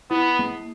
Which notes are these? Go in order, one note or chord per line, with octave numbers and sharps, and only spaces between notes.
B3 E4
A#3